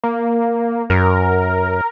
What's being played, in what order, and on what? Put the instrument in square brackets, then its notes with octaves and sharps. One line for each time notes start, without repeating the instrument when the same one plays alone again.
[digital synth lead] A#3
[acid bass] F#2 [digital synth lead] A#4